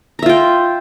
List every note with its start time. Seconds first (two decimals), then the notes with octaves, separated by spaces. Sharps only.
0.19 A#5
0.22 E5
0.26 F4
0.29 G5